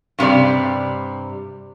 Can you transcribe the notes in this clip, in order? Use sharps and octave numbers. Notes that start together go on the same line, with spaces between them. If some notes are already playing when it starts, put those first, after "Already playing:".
G2 C3 G3 D5